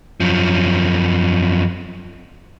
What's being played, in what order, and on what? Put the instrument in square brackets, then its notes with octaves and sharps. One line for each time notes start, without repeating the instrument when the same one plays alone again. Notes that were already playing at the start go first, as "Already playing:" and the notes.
[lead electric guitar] F#2 F3